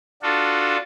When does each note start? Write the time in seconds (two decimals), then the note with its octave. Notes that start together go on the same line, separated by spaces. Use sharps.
0.22 D4 F4 F#4 A4